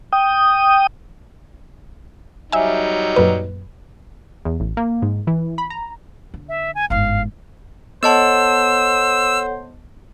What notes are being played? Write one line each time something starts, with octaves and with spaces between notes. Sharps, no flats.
G5 D#6
F#3 G3 D#4 E5 G#5
F#2 A#2 B4
E2
A1
A#3
G#2
E3
B5
A#5
D3
E5
G#5
G1 G#2 F5
B3 A4 C5 C#5 D#5 F#5 A5 E6